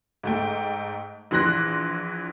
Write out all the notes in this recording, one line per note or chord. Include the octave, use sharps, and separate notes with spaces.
G#2 A3 G5
A#1 E3 C6 F#6 A#6